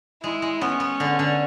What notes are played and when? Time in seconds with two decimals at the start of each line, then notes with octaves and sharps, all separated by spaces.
0.23 G#3 E4
0.42 G#3
0.61 B3 C#4
0.80 B3
1.00 D3
1.19 D3